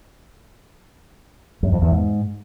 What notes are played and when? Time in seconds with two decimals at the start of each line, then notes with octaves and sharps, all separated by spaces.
1.63 F#2
1.72 F2
1.82 E2
1.91 G#2